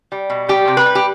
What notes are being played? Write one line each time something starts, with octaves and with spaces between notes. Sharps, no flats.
G3
B2
G3 G4
C3
B4
G3
G4